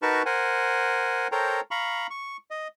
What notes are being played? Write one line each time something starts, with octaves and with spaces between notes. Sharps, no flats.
D#4 F#4 A#4 B4 A5 C#6
A#4 C5 F#5 G#5
A4 A#4 C5 C#5 G5 A#5
F5 A#5 B5 C#6
C#6
D#5